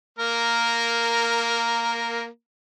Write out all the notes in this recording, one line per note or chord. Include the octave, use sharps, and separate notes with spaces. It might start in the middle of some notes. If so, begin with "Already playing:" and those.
A#3 A#4